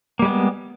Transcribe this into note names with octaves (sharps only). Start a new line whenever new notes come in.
G3 G#3 A#3 B3